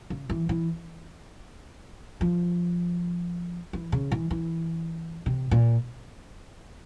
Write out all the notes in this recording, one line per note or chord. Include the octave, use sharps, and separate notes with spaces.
C#3
E3
E3
F3
E3
C#3
E3
E3
C3
A#2